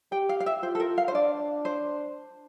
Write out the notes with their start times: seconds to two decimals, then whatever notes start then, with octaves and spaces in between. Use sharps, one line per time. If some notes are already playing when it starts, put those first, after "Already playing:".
0.12 G4 G5
0.29 F5
0.40 F5
0.46 E5
0.63 F4 C5
0.75 A4
0.80 A#4
0.98 F5
1.08 C5
1.14 D4 D5
1.65 C5